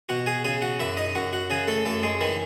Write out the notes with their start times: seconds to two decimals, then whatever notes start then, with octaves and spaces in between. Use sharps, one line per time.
0.09 B2 F#4 F#5
0.26 G#4 G#5
0.44 C#3 G#4 G#5
0.62 F#4 F#5
0.79 F#2 E4 E5
0.97 D#4 D#5
1.15 F#2 F#4 F#5
1.33 F#4 F#5
1.50 C#3 G#4 G#5
1.67 A3 A4
1.85 F#2 A3 A4
2.03 G#3 G#4
2.21 D#3 E3 E4